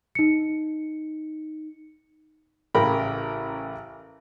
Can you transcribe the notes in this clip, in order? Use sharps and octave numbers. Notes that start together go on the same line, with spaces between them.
D#4 C#7
A1 C#3 A#4 G5 B5